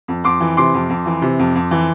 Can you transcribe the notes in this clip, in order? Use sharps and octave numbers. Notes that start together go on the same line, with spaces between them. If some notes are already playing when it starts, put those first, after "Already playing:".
F2
F2 C6 D6
E3
C3 C6 D6
F2
F2
E3
C3
F2
F2
E3